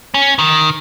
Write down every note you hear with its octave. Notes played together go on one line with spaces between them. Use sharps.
C#4
D#3